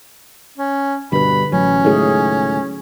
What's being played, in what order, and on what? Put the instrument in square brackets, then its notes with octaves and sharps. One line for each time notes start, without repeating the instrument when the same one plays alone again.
[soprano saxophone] C#4
[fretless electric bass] G2 B2 [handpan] D3 B4 [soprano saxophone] B5
[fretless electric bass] A1 [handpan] F#3 [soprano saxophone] C#4
[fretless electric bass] C#2 A2 D#3 [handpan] F#4 G#4